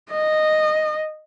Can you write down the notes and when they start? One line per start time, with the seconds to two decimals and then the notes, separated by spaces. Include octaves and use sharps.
0.10 D#5